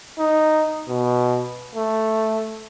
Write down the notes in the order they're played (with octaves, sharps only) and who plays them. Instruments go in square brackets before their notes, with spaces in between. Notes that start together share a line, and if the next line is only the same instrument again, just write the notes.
[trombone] D#4
B2
A3